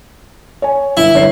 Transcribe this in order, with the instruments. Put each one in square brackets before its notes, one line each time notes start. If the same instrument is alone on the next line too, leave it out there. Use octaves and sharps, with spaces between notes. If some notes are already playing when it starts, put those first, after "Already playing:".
[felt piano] C#5 G#5
[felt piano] G1 [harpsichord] E4
[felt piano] G1 C#5 C7